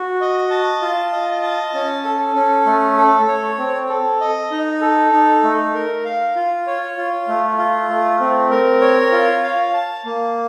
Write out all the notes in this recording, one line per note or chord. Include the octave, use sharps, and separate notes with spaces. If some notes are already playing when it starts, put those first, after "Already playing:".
Already playing: F#4
D#5
A5
F4
D#5
A5
C#4
A4
C#4
A3
A4
C#5
C4
A4
D#5
D#4
A4
D#4
A3
A#4
F5
F4
C#5
F4
A3
F4
A3
C4
A#4
C#5
F4
F5
A5
A#3